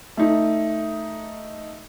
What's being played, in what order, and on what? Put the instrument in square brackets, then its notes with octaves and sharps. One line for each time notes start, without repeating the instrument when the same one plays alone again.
[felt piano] A3 D#4